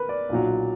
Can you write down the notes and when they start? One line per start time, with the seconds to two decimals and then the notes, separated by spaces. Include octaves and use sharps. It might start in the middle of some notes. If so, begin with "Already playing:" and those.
Already playing: A#4 B4
0.09 D5
0.29 B1 A#2 F#3